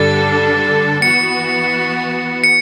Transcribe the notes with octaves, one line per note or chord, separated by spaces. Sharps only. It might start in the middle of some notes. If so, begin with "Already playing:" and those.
Already playing: G2 D3 G3 D4 A4 A6
E3 B3 F#4 C#7
C#7